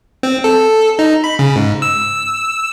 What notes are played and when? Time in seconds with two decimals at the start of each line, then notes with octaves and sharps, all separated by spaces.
0.23 C4
0.44 A4
0.99 D#4
1.24 B5
1.39 C#3
1.56 G#2
1.82 E6